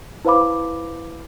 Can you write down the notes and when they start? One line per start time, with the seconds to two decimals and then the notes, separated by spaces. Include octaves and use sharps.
0.25 E4 B4 C5 F5 B5 D6